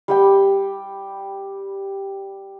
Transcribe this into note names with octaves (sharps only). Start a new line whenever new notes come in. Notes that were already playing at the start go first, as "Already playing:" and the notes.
G3 G4 G5